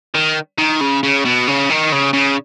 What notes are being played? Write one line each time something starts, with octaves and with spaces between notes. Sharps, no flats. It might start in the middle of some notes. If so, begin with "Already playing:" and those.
D#3
D#3
C#3
C#3
B2
C#3
D#3
C#3
C#3